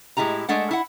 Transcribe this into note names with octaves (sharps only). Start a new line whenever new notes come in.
A2 G#3 E4 G4 A#5
G#3 A3 D4 F#5
E4 F#5